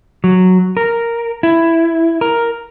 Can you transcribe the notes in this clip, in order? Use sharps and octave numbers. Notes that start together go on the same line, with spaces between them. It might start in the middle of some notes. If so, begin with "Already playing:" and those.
F#3
A#4
E4
A#4